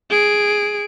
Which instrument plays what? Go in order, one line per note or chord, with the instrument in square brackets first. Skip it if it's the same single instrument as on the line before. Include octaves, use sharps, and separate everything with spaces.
[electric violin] G#4 D7